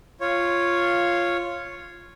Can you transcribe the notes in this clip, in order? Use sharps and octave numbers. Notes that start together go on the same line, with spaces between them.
F4 C#5